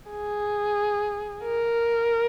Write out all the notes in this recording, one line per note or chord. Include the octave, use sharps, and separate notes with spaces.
G#4
A#4